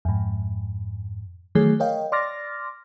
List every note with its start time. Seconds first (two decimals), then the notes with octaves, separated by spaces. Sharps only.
0.05 F2 G#2
1.55 D#3 E3 F#3 A3 G#4 C#5
1.80 A#4 C#5 D#5 F5 G5
2.12 D5 C6 D6 F6 A6 A#6